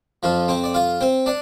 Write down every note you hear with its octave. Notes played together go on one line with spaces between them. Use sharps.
F2 F3 F4
C4 C5
D5
F4 F5
C4 C5
D4 D5